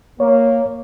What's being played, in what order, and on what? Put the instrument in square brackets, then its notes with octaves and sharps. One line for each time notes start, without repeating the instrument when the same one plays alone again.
[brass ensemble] A#3 [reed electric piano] C#5